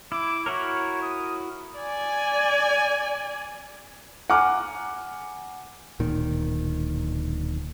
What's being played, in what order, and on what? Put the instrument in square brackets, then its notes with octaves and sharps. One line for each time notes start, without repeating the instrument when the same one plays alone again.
[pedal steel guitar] E4 [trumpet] D6
[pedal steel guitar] E4 F#4 A#4 [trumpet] C#5
[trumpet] D#6
[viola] D5 G#5
[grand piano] F#5 G#5 A#5 D6 F6
[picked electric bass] D1 A#2 D#3